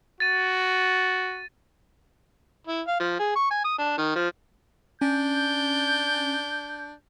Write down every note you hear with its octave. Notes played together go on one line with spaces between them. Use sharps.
F#4 A6 D#7
E4
F5
F3
G#4
C#6
G#5
D#6
D4
D#3
F3
C#4 D4 G6